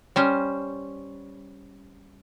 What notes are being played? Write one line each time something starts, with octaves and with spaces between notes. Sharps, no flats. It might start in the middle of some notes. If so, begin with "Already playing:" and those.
G3 C#4 C5